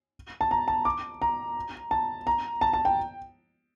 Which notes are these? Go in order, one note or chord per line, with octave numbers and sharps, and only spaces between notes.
A5
A#5
A5
D6
A#5
A5
A#5
A5
A5
G5